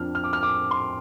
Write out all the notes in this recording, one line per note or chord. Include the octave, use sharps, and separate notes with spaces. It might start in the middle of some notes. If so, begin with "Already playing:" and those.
Already playing: F2 F3 D4 F6
F6
D6
F6
D6
C6